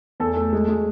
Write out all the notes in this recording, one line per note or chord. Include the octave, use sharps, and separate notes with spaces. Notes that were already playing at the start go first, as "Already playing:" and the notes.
E2 A4
A3
G#3
G#3